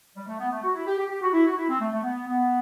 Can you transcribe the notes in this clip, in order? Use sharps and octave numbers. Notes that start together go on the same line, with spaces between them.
G3
A3
B3
A3
F#4
E4
G4
G4
G4
F#4
E4
F#4
E4
C4
A3
A3
B3
B3